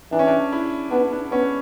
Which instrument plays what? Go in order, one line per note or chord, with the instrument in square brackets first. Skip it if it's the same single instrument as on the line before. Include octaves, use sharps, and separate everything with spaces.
[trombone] E3 [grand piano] D4
[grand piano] C#4
D4
E4
[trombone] B3 [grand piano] D4
[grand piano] D4
[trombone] B3 [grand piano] C#4